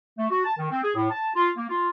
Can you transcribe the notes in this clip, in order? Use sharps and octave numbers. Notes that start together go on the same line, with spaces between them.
A3
F#4
A5
D#3
C4
G#4
A2
A5
F4
A#3
F4